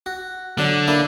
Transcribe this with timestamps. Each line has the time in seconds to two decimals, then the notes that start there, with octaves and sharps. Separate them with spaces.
0.06 F#4
0.58 D3 F#3 D4
0.88 A#3 D4 E4